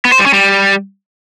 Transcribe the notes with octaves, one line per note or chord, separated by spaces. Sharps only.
B3
C5
G3
C#4
G3